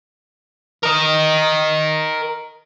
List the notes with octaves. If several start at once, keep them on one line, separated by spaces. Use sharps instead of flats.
A#4 D#5